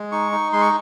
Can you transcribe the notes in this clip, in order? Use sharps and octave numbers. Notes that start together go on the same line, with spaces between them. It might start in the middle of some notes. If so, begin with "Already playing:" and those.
Already playing: G#3
D#4 C#6
D#4
G#3 C6
C#6